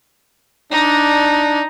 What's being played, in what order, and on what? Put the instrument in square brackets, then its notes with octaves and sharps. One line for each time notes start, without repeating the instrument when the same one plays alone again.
[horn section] D4 [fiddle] D#4